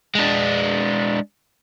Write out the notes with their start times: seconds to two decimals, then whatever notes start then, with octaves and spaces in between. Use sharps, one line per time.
0.15 G#3 D4